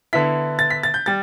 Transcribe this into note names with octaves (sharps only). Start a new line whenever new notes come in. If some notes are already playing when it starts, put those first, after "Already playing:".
D3 B3 E4 B6
A6
B6
A6
G6
G3 A6